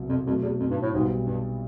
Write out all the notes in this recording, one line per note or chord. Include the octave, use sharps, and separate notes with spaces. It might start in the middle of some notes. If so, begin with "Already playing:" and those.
Already playing: C2 B2 F#3
F2
F2 B2 F#3 A3
E2
F2
G2
A2
B1 G#2 B2 G3
G2